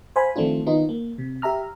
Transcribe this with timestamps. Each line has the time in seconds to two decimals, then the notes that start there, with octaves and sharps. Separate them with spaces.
0.16 C5 F5 G#5 B5
0.36 D#3 F3 A3 C4 D4 F4
0.66 D#3 B3 D#4 F4
0.89 A#3
1.18 C3
1.42 G4 E5 A#5 F6